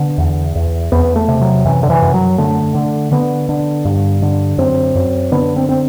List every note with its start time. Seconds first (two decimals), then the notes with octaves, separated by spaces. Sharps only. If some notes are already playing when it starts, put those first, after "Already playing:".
Already playing: D3 B3
0.18 E2
0.55 E2
0.92 E2 B3
1.16 A3
1.28 C3
1.41 F#3
1.65 F#2 E3
1.83 D3
1.90 E3
2.02 F#2
2.14 F#3
2.38 D3 A3
2.75 D3
3.11 D3 B3
3.49 D3
3.85 G2
4.22 D3
4.58 F#2 C4
4.95 F#2
5.32 D3 B3
5.56 C4
5.69 C4